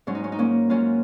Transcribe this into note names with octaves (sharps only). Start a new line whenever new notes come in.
G#2 F#3 C#4
D#4
C#4
D#4
A#3 C#4
G#2 F#3 C#4 F4